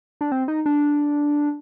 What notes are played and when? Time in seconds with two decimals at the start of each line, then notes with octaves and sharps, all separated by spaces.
0.21 D4
0.32 C4
0.48 D#4
0.66 D4